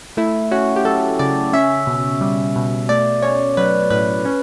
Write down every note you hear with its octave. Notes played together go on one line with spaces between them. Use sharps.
A3 E4
C#4 F#4
G4
F#3 A4
C#3 D5
C#4 E5
B2
G3
B2
A3 D5
C#4 C#5
F#3 B4
A2 B4
C#4